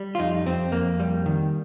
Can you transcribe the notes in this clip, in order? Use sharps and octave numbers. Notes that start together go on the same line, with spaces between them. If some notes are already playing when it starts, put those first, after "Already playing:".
Already playing: G3
F4
F2 D#4
F2 C4
F2 A#3
G3
D#3